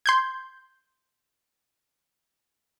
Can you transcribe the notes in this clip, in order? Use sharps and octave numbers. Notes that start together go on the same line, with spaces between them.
C6 G6 G#6